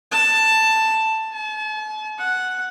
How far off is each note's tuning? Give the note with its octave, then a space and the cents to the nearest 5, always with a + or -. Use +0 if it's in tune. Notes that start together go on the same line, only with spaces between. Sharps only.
A5 +5
A5 -45
F#5 +0